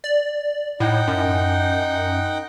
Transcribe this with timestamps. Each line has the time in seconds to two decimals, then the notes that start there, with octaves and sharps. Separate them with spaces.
0.04 D5
0.80 A2 D#4 F#5 G5
1.07 F#2